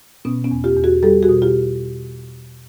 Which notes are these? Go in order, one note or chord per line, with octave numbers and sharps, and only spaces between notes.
B2 B3 C#4
B3 C#4
E2
F4 G4
E2
F#4 G#4
G3 G4 A4
F#4 G#4
B2
F4 G4